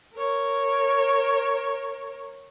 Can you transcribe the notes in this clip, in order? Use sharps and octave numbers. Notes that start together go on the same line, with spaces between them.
A#4 C#5